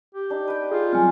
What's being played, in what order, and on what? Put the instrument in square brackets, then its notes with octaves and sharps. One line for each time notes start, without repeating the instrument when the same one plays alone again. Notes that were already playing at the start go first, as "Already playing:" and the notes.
[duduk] G4
[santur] D4 D#4
B4 G5
[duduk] F4 [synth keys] G#4 D#5
[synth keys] F#3 G3 C4 [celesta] G#5 F6